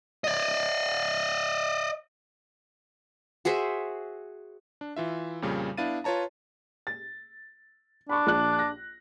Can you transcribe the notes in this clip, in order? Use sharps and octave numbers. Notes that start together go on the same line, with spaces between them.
D5 D#5
F#4 G#4 C5 E5
D4
E3 F4 E5
F2 A#2 C#3 G3
B3 D4 E4 F5 A6 D#7
F4 B4 C#5 A5 A#5
A6
D4 B5 C#6
A#1 F#6
A#6